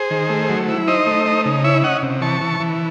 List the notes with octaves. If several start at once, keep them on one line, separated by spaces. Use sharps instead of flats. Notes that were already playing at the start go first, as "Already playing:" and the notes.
Already playing: G#4 C5
D#3
A3
F#3
E4
D#4 C5 D#5
A3
D#4
C#3
E4 C#5 E5
C#4 D#5 F#5
C3
E3 A5 C#6
E3
E3